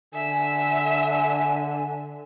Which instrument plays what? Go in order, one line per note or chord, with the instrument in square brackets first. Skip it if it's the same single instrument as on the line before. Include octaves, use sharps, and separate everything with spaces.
[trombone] D3 [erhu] E5 [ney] G#5